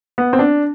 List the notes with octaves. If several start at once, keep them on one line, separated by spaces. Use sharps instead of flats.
B3
C4
D4